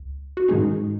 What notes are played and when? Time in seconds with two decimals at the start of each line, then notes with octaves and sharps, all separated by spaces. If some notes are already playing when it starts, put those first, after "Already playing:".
Already playing: C#2
0.37 F#4
0.48 G#2 D#3 G#3 C#4 D#4 G#4